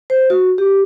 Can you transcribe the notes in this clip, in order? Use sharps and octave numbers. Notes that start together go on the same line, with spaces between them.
C5
F#4
G4